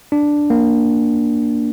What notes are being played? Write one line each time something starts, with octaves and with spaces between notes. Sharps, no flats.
D4
A#3